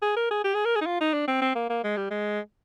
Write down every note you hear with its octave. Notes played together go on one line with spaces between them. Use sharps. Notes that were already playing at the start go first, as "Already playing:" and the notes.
G#4
A#4
G#4
G4
G#4
A#4
G#4
D#4
F4
D#4
D4
C4
C4
A#3
A#3
G#3
G3
G#3